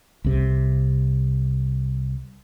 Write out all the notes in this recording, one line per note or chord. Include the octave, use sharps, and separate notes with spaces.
C2 C3